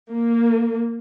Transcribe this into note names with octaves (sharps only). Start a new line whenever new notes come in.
A#3